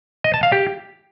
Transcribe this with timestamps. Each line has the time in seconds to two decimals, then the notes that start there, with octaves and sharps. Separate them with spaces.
0.24 D#5
0.34 A5
0.43 F5
0.52 G4